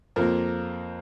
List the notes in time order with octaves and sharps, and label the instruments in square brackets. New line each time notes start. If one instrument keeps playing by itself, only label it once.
[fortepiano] F2 F3 A#3 A#4